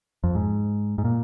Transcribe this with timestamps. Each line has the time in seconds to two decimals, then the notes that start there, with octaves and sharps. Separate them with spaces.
0.24 F2
0.35 G#2
0.98 G#2
1.05 A#2